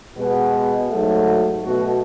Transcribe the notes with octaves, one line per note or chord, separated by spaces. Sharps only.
B2 G#3 B3 F#4
G#2 F#3 A3
B2 A3 F#4